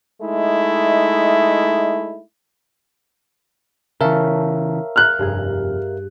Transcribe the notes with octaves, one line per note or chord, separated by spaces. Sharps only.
G#3 A3 D#4 E4
C#3 E3 A#4 C#5 E5 F5 A5
A#5 F6 F#6
F1 G2 G#4